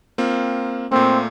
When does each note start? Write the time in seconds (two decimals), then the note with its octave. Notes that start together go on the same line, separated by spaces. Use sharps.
0.18 A#3 C4 F4
0.92 A#2 A3 A#3 C4